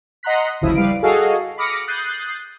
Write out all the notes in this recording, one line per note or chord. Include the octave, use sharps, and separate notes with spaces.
D#5 F#5 A#5 C6 F#6 B6
G1 D2 C#3 F3 E4 D#6
G3 B4 F5 D7
F#4 G#4 A4 D#5 F5
B5 D6 D#6 F6 A#6 C#7
D#6 F#6 G6 A6 C7